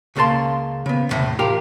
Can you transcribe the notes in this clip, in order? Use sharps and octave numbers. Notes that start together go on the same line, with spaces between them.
C#2 C#3 A#3 D4 A5 C6
C#3 B3
B1 E2 A2 C3
F4 G4 A#4